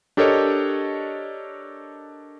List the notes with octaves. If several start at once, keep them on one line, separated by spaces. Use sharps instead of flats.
D4 G4 A4 A#4 C#5 D#5